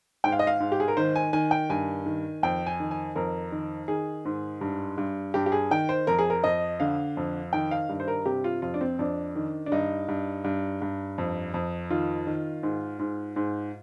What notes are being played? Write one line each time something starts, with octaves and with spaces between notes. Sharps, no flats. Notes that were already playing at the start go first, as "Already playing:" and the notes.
G#2 G5
F5
D#5
F5
G#2
G4
G#4
A#4
D#3 C5
G#5
D#3 G#5
G5
G2 G#5
D#3
F2 G5
G#5
D#3
G#5
F2 A#4
D#3
D#3 G#4
G#2
G2
G2
G2 G4
G4
G#4
D#3 G5
C5
F2 A#4
G#4
A#4
F2 D#5
D3 F5
F2
D#3 G5
F5
G2
C5
A#4
C3 G4
F4
F2 F4
D4
C4
F2 D4
D#3
D4
G2 D#4
G2
G2
G2
F2
F2
D#3 F4
D#3
G#2
G#2
G#2